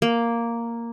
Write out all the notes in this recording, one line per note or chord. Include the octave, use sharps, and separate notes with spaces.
A#3